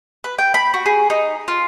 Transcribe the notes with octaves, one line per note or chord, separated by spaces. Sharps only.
B4
G5
B5
F#4
G#4
D#4
F4